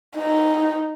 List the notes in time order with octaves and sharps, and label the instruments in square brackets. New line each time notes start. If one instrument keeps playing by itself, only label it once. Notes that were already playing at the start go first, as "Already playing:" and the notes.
[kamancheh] D#4